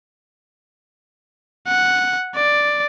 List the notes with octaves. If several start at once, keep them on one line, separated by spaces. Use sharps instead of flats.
F#5
D5